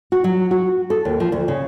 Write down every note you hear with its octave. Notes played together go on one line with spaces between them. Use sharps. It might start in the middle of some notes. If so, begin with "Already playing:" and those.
F#4
F#3
F#4
A4
D#2
F3
D2
C#3